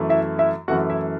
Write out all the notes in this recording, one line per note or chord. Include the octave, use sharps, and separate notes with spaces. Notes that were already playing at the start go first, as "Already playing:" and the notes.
Already playing: F#2 E3 A3
E4 E5
E4 E5
F#2 E3 A3 F#4 F#5
E4 E5